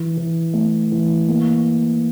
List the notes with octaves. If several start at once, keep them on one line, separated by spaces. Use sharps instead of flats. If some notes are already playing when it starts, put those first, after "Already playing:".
Already playing: E3
E3
A3
E3
A#3